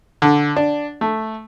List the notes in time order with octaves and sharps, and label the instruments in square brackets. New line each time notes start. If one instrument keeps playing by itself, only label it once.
[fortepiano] D3
D4
A3